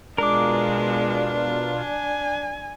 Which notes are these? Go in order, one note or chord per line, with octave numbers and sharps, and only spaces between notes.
B2 G#3 D4 F4 A#4 D6
G#5